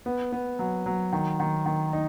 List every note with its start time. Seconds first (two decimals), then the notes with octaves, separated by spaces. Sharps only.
0.06 B3
0.32 B3
0.59 F#3
0.86 F#3
1.13 D#3
1.40 D#3
1.66 D#3
1.93 D#4